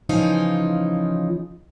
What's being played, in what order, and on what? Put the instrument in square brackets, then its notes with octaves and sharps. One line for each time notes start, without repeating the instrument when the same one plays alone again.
[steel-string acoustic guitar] C#3 E3 F3 D#4 F4